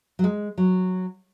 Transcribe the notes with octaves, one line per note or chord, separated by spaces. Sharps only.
F#3
G#3
F#3